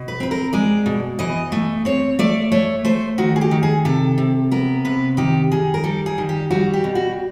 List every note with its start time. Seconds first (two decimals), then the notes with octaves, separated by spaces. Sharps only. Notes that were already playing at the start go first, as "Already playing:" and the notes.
Already playing: B2
0.08 B4
0.20 C4 B4
0.31 A#4
0.53 G#3 D5
0.86 B2
1.19 E3 D#5
1.52 A3
1.85 C4 C#5
2.19 A3 D5
2.52 A3 C#5
2.85 A3 C5
3.18 D#3 F#4
3.36 G#4
3.41 G4
3.51 D#3
3.63 G#4
3.85 C3 A4
4.18 C3
4.51 B3 A#4
4.85 C3 B4
5.17 D#3 G4
5.51 D#3 G#4
5.74 A#4
5.84 G3 A4
6.06 G#4
6.18 D#3
6.29 G4
6.51 G3 F#4
6.74 G4
6.84 B2
6.95 F#4